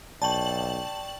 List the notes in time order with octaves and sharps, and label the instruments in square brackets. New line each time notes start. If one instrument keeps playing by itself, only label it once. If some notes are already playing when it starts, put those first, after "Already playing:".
[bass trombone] B1 [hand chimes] D5 G5 C#6 [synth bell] A5 F#7